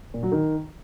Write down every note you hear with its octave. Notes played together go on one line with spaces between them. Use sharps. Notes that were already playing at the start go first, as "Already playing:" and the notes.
A#2
F#3
D#3